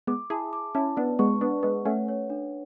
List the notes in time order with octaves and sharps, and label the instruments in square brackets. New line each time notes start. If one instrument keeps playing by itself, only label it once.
[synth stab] G#3 B3 [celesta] D6
[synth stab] E4 G#4 [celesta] A5
[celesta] D6
[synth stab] C#4 E4 [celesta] A5
[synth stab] B3 D4 [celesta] B4
[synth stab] G#3 B3 [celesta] C#6
[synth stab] B3 D4 [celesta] B4
[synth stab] G#3 B3 [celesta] B4
[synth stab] A3 C#4 [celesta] F#5
[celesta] C#5
D4